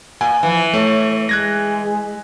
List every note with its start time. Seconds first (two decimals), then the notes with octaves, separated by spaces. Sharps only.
0.21 A#2 G#5
0.43 E3 F3
0.73 A3 C#5
1.29 G#3 F#6 G#6 A#6